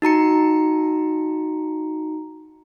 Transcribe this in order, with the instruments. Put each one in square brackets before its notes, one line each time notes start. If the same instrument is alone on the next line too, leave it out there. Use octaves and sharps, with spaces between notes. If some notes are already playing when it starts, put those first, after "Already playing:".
[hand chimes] D#4 F#4 A#5 C#7